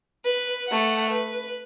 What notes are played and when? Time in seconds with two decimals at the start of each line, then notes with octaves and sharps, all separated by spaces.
0.25 B4
0.67 A3 F#5
1.10 B4